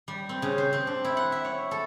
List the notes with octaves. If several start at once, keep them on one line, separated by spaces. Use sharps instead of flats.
G3
C4
C#3
C5
C4
D4
E4
F#5
E5
C#5
A4